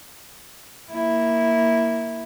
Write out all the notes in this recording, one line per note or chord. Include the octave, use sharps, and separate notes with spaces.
A#3 E4